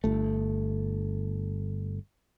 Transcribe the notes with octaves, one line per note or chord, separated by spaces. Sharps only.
G1 A3